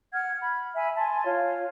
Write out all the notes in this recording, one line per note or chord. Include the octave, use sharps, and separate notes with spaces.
F#5 F6 G#6
B5
E5 G#5 B5
G#5 A5 C6
F4 C#5